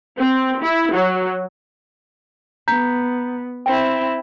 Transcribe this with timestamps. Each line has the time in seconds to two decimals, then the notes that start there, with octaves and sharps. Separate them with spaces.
0.19 C4
0.61 E4
0.93 F#3
2.68 B3 A#5 G6 B6
3.66 C4 E4 G5